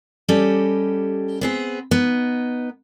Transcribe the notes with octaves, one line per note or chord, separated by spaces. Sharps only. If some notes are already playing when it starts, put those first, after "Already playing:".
G3 C#4 G4 A4 D#5
B3 C4 G#4
B3 D#4